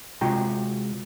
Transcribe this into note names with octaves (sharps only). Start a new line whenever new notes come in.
C3 G#3 F4 F#4 G5 A#5